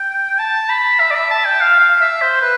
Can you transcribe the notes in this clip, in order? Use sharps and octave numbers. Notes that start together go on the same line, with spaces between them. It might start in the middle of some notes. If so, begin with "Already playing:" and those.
Already playing: G5
A5
B5
E5
D5
E5
A5
G5
F5
F5
E5
C5
B4